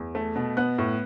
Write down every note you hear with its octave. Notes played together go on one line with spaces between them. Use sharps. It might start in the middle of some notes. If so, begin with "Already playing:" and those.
Already playing: E2
A3
B2
B3 F#6
A2